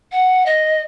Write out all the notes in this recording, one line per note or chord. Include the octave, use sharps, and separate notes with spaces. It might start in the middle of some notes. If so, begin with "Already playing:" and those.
F#5
D#5